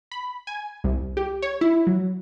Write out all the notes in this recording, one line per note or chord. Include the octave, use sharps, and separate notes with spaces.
B5
G#5
C2
G4
C#5
E4
F#3